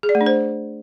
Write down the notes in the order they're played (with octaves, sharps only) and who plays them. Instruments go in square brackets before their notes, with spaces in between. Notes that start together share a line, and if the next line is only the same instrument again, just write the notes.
[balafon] G#4
D5
A3
D4
C5